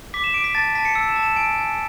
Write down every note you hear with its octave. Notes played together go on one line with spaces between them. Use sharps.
D6 B6
E7
D6 D7
B6
A5 A6
A5 B6
C#7
E6 C#7
E7
A5
E7
G#5 D7
G#5